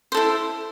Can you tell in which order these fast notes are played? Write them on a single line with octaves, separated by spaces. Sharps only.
C5 A4 E4